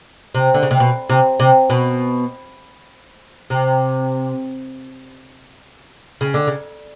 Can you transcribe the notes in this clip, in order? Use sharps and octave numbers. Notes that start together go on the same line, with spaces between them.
C3
D3
C#3
C3
B2
C3
C3
B2
C3
C#3
D3
C#3